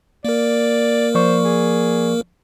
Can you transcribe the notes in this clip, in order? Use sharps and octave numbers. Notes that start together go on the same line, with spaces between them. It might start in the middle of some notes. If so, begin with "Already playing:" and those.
A#3 A#4 D5
F3 C5 D5 C#6
G#4